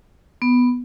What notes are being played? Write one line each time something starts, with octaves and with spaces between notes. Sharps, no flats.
B3